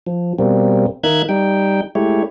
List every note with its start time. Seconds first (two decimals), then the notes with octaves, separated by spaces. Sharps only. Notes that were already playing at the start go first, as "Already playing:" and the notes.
0.07 F3
0.39 B2 G3 A#3 C4
1.04 D#3 A#3 D#4 E5 F#6 G#6
1.29 G3 D#4 G5
1.95 G#3 A3 E4 G4 C#5